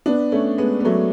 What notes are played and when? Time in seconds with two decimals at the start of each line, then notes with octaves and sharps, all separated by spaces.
0.06 B3 D4
0.32 A3 C#4
0.58 G#3 B3
0.80 B3
0.85 F#3 A3